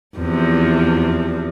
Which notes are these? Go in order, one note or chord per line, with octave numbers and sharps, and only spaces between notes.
E2 C3 F3